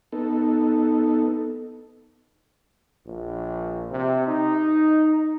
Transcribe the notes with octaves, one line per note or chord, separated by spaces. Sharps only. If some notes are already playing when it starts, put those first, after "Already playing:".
B3 D#4 A4
A#1
C3
D#4